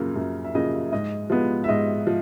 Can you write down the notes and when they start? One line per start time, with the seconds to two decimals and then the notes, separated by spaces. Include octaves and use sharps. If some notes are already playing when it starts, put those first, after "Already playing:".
Already playing: F#2 C#3 F3 A#3
0.16 F#2
0.44 E5
0.55 C#3 F3 A#3 D#5
0.92 G#2 D#5
1.30 F3 G#3 B3
1.64 E5
1.68 G#2 D#5
2.07 F3